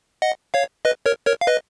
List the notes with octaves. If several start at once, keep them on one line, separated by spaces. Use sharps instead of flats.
D#5 F#5
C#5 F5
B4 D#5
A#4 C#5
A#4 C#5
F5
B4 D#5